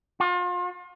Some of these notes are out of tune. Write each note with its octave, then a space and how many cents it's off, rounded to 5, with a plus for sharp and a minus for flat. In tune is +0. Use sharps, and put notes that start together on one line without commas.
F4 +35